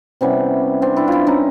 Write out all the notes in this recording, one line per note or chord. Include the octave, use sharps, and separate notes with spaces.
C3 E3 G3 B3 C#4
C4 D4
D4 E4
D4 E4 F4
C#4 D#4